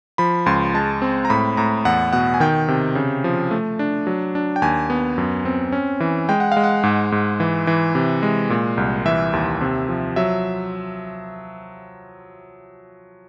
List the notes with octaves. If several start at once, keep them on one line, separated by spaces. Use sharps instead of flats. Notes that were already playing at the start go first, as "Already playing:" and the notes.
F3 B5
C#2 C6
G#3 A5
C4
A#5
A2 B5
A2 A#5
E2 F#5
B2 F#5
G#5
D#3 G5
C3
C#3
F3
A3
D4
F#3
D4
G5
D#2 G#5
B3
F#2
C4
C#4
E3
G#3 G5
F#5
G#3 F5
F#5
G#2
G#2
E3
E3
C3
G#3
A#2
C2
E3 E5
D#2
C3
F3
F#3 E5